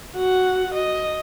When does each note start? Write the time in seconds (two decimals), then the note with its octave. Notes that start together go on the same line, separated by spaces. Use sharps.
0.15 F#4 F#5
0.74 D#5